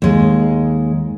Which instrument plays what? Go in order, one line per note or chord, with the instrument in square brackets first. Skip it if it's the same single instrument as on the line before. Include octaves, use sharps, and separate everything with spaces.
[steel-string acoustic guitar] D#2 G#3